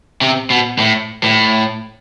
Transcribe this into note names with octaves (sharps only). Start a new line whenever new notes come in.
C3
B2
A2
A2